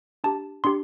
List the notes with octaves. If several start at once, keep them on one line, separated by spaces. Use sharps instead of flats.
D4 G4 A5
D4 G4 C6